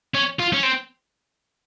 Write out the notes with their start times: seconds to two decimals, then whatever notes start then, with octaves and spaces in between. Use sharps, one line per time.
0.15 C#4
0.40 F4
0.53 C#4
0.63 C4